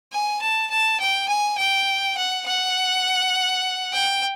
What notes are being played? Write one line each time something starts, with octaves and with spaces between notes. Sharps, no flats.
G#5
A5
A5
G5
G#5
G5
F#5
F#5
G5